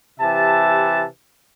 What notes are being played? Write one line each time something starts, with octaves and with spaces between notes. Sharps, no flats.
C3 E3 G4 E5 A5